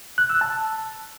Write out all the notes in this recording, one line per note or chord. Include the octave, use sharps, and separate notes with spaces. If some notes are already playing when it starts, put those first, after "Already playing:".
F#6
E6
A5